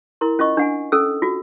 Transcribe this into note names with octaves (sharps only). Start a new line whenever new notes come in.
E4 A#4 C6
C#4 F4 D#5 C#6
D4 F#5 G#5
C#4 A4 E6
F4 F#4